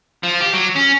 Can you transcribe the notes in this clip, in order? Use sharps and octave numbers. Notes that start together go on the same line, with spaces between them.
F3
G4
F#3
C#4